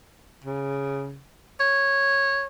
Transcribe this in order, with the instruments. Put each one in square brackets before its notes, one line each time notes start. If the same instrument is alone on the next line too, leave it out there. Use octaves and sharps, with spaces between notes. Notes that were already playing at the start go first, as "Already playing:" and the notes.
[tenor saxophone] C#3
C#5